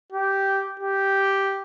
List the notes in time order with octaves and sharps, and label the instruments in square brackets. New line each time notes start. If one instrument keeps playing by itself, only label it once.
[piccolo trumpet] G4
G4